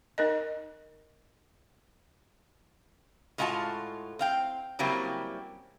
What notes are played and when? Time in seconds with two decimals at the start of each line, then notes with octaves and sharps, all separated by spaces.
0.18 D#4 A#4 D#5
3.38 A2 G#3 F4 F#4 G#5 A5
4.19 C4 F5 G5
4.79 C#3 F#3 G3 A#3 C4 E4